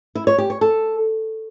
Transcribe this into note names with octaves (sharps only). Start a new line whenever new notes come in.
E4
C#5
G4
C#5
A4